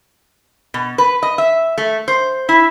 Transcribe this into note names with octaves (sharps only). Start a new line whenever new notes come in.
B2
B4
D#5
E5
A3
C5
E4